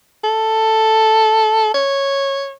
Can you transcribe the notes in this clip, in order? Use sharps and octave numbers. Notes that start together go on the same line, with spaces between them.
A4
C#5